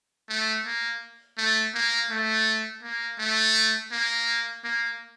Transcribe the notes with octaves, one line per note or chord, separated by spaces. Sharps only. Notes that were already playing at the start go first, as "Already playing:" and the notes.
A3
A#3
A3
A#3
A3
A#3
A3
A#3
A#3